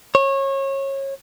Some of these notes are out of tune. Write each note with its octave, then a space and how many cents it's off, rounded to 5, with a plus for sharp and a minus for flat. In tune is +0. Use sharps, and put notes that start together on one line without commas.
C#5 -25